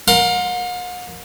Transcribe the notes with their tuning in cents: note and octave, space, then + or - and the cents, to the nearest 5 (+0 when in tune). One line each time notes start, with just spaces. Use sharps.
A#4 +15 F#5 -45 C6 +0